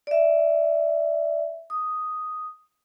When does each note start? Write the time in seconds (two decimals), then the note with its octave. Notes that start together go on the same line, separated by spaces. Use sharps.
0.07 D5 E5
1.70 D#6